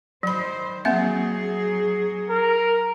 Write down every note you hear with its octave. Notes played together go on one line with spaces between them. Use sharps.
D#3 F#3 C5 B5
F#3 A#3 C4 G#4 E5
A#4